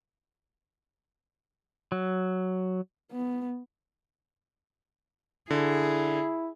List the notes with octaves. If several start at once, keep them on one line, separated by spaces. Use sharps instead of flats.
F#3
B3
D3 E4 G#4